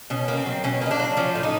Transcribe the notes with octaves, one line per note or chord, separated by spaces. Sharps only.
B2 C#4
A#3
C4
F#3
B2 C#4
A#3 D#4
D4
F#3
F3 C#4
A2
D#4